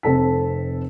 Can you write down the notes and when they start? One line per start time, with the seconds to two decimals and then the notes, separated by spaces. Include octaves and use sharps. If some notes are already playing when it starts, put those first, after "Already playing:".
0.03 F1 C4 A4 B6